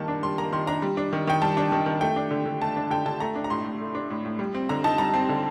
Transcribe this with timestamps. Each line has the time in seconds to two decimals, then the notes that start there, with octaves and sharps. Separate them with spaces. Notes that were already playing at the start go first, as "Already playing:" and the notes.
Already playing: D#3 G3 A#3 A5
0.08 D4
0.23 G3 C6
0.38 A#3 A#5
0.52 D#3 C6
0.67 D4 A#5
0.82 G3
0.97 D4
1.13 D#3
1.27 D#3 G5
1.42 G3 A5
1.57 D4
1.72 D#3
1.86 D#3
2.01 A3 G5
2.16 D4
2.31 D3
2.46 D3
2.62 A3 A5
2.76 D4
2.90 D3 G5
3.06 D3 A5
3.20 A3 A#5
3.35 D4
3.44 A#5
3.50 A2 C6
3.65 A2
3.80 A3
3.95 D4
4.10 A2
4.25 A2
4.39 G3
4.54 C4
4.69 D3 A#5
4.84 D#4 A5
4.98 G3 A#5
5.14 C4
5.29 D3